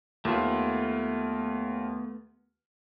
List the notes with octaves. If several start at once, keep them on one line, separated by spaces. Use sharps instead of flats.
D#2 A3 B3 F4